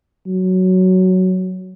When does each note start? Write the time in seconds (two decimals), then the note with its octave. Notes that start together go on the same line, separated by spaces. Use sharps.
0.27 F#3